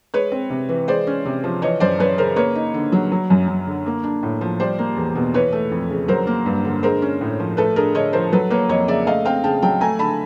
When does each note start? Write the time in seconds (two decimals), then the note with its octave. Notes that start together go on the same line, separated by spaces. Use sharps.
0.14 G#3 B4 C#5
0.32 C4
0.50 C3
0.69 E3
0.88 G#3 C5 D5
1.07 C#4
1.25 C3
1.44 F3
1.62 E3 C#5 D#5
1.80 F#2 C5 D5
1.99 F#2 B4 C#5
2.18 C#3 A#4 C5
2.36 A#3 B4 C#5
2.55 D#4
2.74 D3
2.92 F#3
3.12 F#3
3.30 F#2
3.48 F#2
3.67 D3
3.86 A#3
4.04 D4
4.23 A2
4.41 F3
4.60 G3 C5 D5
4.78 A#3
4.97 E2
5.15 B2
5.34 E3 B4 C#5
5.52 A3
5.71 F2
5.90 C#3
6.08 F#3 A#4 C5
6.27 A#3
6.46 G2
6.65 D3
6.83 G#3 A#4 C5
7.02 C#4
7.21 A2
7.40 F3
7.57 A3 A4 B4
7.76 D4 G#4 A#4
7.95 D3 C#5 D#5
8.13 F3 A#4 C5
8.32 F#3 A4 B4
8.50 A#3 B4 C#5
8.69 F2 C#5 D#5
8.88 C#3 D5 E5
9.06 A3 D#5 F5
9.25 C4 F5 G5
9.44 C#3 G5 A5
9.62 F#3 G5 A5
9.81 A3 G#5 A#5
9.99 D3 A5 B5